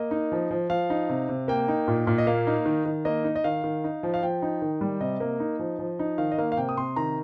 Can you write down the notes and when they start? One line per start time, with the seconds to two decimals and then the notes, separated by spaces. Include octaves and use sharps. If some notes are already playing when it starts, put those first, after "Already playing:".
Already playing: A#3 D#5
0.11 D#4
0.32 F3
0.51 F3
0.70 F3 F5
0.90 D#4
1.09 C3
1.29 C3
1.48 A#3 G5
1.68 D#4
1.88 A#2
2.07 A#2
2.18 D#5
2.27 A#3 F5
2.47 D#4
2.66 D#3
2.86 D#3
3.05 A#3 D#5
3.24 D#4
3.36 D#5
3.44 D#3 F5
3.64 D#3
3.84 D#4
4.03 F3
4.14 F5
4.23 F3 G5
4.42 D#4
4.62 D#3
4.81 G3
5.00 C3 D#5
5.20 A#3
5.40 D#4
5.59 F3
5.79 F3
5.99 D#4
6.18 D#3 F5
6.32 D#5
6.38 A#3 F5
6.52 F5
6.57 C3 G5
6.69 D#6
6.77 C3 C6
6.96 D#3 A#5